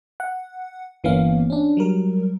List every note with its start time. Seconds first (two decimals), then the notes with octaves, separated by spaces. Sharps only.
0.20 F#5
1.04 G1 E3 A#3 B3 C#4 F5
1.50 C#4 D4
1.77 F#3 G3 A#4